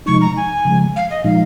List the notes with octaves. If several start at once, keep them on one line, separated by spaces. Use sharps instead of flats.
C3 F3 G#3 D#4 C#6
A#5
G#5
C#3 F3 G#3
F5
D#5
A#2 F3 G#3 D#4 F5